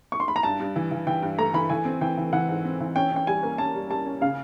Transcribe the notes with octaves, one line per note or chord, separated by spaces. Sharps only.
C#6
C6
B5
A#5
G2 A5
G2
E3
E3
E3 G5
G2
A3 A#5
E3 B5
E3 G#5
C4
E3 G5
E3
E3 F#5
G#2
C4
E3
C#4 G5
C#4 G5
G3 G#5
A#3
C#4 A5
G3
G3 A5
C#4
C#3 F5